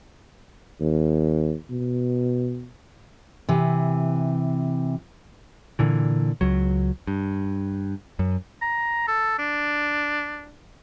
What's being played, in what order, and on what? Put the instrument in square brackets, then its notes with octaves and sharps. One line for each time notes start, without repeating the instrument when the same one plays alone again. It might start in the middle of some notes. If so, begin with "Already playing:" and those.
[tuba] D#2
B2
[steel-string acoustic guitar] C3 E3
[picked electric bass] A#2 D3 E3
C#2 F#3
G2
F#2
[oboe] A#5
A4
D4